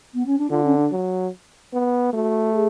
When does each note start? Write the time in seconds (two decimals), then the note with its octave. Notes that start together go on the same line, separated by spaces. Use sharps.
0.14 B3
0.26 C#4
0.38 D4
0.50 D3 F4
0.64 C#4
0.77 D4
0.91 F#3
1.73 B3
2.13 A3 F#4
2.54 G#4